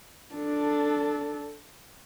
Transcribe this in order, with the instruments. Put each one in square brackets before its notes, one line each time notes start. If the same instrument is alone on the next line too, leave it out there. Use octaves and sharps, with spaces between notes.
[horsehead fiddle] D4 A4